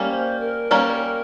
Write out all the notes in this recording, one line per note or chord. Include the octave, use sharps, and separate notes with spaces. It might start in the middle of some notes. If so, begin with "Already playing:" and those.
Already playing: G3 A#3 C#4
C5
A#4
G3 A#3 C#4